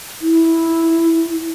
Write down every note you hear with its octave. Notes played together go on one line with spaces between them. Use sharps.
E4